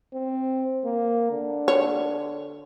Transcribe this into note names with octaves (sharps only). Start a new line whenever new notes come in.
C4
A#3
D3
C#5